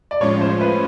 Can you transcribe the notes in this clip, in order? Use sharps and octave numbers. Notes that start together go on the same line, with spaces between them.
D5
A2 F3 G#3 C#4 F4 C#5
C5
B4